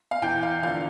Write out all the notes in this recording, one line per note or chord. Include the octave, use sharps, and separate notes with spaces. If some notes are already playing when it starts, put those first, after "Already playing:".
F5
E2 E3 G5
F5
E2 D3 F3 F5